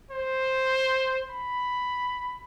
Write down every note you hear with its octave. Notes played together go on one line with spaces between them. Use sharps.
C5
B5